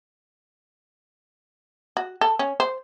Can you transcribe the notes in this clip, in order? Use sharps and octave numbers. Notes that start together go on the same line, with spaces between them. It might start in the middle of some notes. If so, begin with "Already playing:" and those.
F#4
A4
C#4
C5